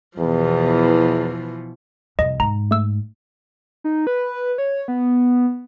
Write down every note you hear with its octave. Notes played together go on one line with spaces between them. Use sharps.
E2 B2 E3 F3
C2 F2 D#5
G#2 A#5
A3 E6
D#4
B4
C#5
B3